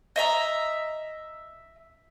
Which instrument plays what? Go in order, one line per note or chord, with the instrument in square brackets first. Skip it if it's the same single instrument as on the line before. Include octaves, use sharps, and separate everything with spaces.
[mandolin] D#5 E5 A#5